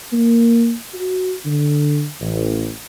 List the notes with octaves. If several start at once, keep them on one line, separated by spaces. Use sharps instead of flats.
A#3
F#4
D3
A1